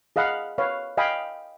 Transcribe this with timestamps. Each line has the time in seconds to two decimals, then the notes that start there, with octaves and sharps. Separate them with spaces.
0.16 G#4 D#5 F5 F#5 B5
0.58 B4 C#5 F5
0.97 D#5 F5 G5 G#5 B5